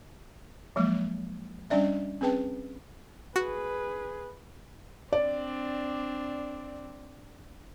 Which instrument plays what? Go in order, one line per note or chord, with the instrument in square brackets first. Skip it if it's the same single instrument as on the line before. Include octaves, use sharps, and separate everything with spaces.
[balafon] F3 F#3 G#3 A#3
G3 C#4 D4 D5 E5
C4 C#4 G#4 B4 G5 A5
[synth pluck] F#4 [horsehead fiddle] G#4 B4
[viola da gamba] C4 D4 [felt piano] D5